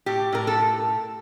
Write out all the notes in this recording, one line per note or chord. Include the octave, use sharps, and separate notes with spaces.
A2 G4
A2 A#4
A4